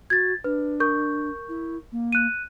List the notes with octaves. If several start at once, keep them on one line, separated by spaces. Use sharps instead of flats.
F#4 G#6 A6
D4 B4
A#4 C#6 G6
E4
A#3
F#6 D#7